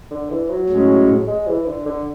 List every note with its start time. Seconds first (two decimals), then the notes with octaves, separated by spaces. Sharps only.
0.11 D3
0.30 E3
0.50 F#3
0.69 A2 G#3 C#4
1.27 G#3
1.47 E3
1.66 D3
1.86 D3